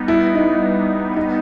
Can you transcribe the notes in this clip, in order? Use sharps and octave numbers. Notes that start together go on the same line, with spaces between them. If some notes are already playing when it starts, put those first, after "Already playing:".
Already playing: G3 B3 D#4
E4
D#4
D#4